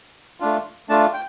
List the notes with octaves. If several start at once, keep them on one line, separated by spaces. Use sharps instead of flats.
A3 D4 F4
A3 D4 F4 A5
G5